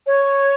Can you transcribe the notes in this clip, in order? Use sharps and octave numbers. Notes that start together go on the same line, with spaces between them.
C#5